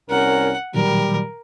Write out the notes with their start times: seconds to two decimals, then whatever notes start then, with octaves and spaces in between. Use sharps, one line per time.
0.10 C2 C#4 A#4 F#5
0.74 A#2 D#3 F#3 G3 A#4